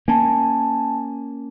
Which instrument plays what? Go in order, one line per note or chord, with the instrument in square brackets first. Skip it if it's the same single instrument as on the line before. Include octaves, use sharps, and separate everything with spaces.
[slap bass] A#3 C#4 [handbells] G#5 A5